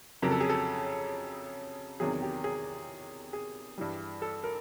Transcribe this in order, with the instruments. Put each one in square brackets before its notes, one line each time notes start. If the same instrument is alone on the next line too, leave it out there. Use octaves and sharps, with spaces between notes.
[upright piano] F2 C#3 F#3 A#4
A4
G#4
A4
E2 C3 D#3 F#3 G#4
G4
G#4
G#4
G2 E3 G3
A4
A#4